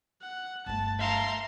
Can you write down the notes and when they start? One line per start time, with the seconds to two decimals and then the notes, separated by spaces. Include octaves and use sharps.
0.22 F#5
0.66 G1 A3 A5
0.99 E5 F5 A5 A#5 C6